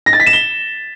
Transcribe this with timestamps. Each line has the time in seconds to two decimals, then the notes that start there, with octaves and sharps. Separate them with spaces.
0.06 A#6
0.13 A6
0.20 B6
0.26 E7
0.33 G7